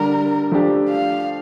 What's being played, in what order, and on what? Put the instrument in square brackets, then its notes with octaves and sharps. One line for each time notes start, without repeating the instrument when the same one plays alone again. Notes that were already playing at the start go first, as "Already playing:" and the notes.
Already playing: [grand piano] D3 G3 D4 [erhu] A#4
[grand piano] F3 A3 D4 G4
[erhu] F5